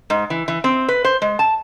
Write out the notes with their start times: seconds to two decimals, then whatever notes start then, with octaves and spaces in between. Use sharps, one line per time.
0.10 G#2
0.30 E3
0.48 E3
0.64 C4
0.88 B4
1.04 C5
1.22 G#3
1.39 A5